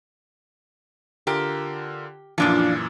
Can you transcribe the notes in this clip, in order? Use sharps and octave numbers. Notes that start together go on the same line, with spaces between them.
D3 F4 G4 A#4
F#2 A#2 E3 F3 D4 F4